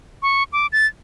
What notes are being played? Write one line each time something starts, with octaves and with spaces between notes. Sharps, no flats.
C#6
D6
A6